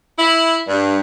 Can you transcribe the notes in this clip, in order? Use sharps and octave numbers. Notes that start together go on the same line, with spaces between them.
E4
G2